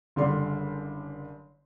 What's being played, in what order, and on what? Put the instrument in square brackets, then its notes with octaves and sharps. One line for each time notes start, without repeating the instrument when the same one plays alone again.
[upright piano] F#1 D3 G3 C6